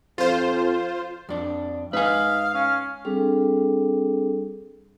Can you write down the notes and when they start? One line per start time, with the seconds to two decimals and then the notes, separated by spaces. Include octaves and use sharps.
0.18 F2 F3 F4 C5
1.29 F2 D4
1.93 G#2 B4 D#5 F5 G#5
2.54 C#4 F5
3.05 G3 C4 D4 G#4 A4